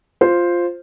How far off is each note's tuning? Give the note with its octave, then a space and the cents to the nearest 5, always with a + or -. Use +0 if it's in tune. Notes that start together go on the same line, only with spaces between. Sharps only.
F4 +0 C5 +0